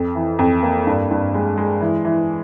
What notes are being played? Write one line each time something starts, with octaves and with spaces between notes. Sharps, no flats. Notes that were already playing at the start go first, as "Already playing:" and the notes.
Already playing: F2
E3
F2
A#3
G2
G2
G#3
G#3
E3
E3